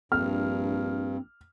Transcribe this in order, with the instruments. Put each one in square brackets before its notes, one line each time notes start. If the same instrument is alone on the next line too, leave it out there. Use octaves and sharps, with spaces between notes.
[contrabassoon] A#1 [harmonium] G2 [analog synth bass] C4 [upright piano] F6